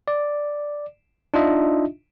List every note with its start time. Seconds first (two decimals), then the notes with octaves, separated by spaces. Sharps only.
0.08 D5
1.34 D4 D#4 F4 D#5 E5